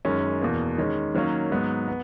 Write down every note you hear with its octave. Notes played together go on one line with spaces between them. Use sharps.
F#2 D#3 G#3 C#4
E2 B2 A#3
D#3 G#3 C#4
D#3 F#3 A#3 C#4
G#2 F#3 B3
B3